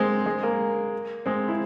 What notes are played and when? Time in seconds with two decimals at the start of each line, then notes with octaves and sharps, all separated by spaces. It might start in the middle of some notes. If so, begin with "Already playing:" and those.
Already playing: G#3 A#3 C4
0.26 G#3
0.43 A#3
1.26 G#3 C4
1.48 E4